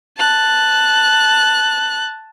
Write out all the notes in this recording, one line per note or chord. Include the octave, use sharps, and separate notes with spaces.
A5 F#6